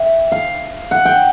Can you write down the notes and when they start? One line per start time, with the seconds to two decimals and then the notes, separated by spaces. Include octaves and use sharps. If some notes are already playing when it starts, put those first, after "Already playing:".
Already playing: E5 G5
0.32 F5
0.91 F#5
1.05 G5